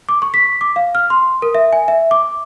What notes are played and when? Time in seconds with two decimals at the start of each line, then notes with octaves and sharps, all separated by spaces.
0.09 D6
0.22 C#6
0.34 B6
0.61 D6
0.76 F5
0.95 F6
1.10 C6
1.42 A#4
1.55 E5
1.73 G#5
1.88 E5
2.11 D6